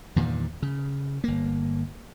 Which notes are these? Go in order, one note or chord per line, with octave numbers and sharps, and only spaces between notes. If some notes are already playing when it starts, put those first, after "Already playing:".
E2 G2 A#2 D#3
C#3
G1 A#3